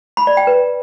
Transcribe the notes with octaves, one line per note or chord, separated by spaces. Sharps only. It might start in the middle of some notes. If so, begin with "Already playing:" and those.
B5
D5
G5
B4